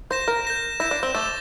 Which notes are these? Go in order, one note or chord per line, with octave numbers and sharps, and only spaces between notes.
C5 G6 A#6 E7
A#4
G6 A#6 E7
E4 G6 A#6 E7
D4
C4
A3 D6 A6 E7 G7